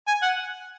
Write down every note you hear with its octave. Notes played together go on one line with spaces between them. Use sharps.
G#5
F#5